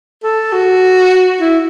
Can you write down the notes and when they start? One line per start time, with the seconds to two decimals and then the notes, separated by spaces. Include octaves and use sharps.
0.23 A4
0.52 F#4
1.41 E4